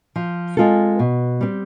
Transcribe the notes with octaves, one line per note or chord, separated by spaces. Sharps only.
F3
G#3 C4 F4 A4
B2
G3 C4